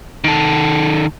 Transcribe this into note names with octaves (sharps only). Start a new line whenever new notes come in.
D#3 A4